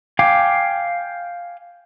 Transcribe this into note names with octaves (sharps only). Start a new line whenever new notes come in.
F5 G5 G#5 D6